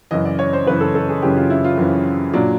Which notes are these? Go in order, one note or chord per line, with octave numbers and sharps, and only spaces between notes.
F#2 C#3 E3 D#5
D5
C#5
C5
F#2 C#3 E3 B4
A4
A4
G#4
F#2 C#3 E3 G4
F4
E4
F4
F#2 C#3 E3
A#2 F#3 D4